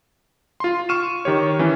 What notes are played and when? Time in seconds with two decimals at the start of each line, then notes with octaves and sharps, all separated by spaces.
0.60 F4 C6
0.89 C#6 F6 D#7 E7
1.25 D#3 G4 C#5
1.59 E3 C#4